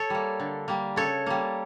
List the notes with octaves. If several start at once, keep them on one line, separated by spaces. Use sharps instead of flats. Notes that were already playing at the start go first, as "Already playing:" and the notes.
Already playing: A4 C#5
G3 A#3
D3
G3 A#3
C#3 A4 C#5
G3 A#3